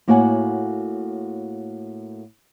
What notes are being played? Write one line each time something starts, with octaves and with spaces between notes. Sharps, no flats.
A2 A#3 F#4 C#5 F#5 G#5